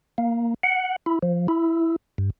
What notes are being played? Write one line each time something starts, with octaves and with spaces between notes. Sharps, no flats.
A#3
F#5
E4
F3
E4
G2